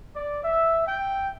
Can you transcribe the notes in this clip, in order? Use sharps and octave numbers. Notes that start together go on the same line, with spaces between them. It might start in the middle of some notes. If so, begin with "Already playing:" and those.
D5
E5
G5